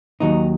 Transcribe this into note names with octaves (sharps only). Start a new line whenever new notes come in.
D#2 D#3 F#3 D#4